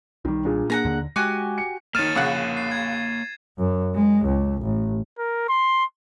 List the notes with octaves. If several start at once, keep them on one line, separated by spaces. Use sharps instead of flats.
B1 D#3 G3
A#2 D4 G#4
A#3 D4 G#4 F#5 G#5 A#5 A#6
D#2 D3
G#3 F#4 G4 G#5 D6
C#7
D#3 A#3 C#5 F6 A6 D#7 E7
A#1 C#3 F#5
C7
G#6
F#2
G#3
C#2
A1
A#4
C6